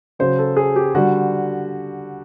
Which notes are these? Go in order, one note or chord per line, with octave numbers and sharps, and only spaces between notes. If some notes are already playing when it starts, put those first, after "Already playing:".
C#3 F#3 C5
A4
G#4
G4
D3 G3 F#4